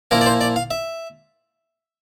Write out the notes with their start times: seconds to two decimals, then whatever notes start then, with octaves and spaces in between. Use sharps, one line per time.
0.11 A#2 F3 A#3 E4 A#4
0.21 D5
0.26 C5
0.41 D5
0.56 F5
0.71 E5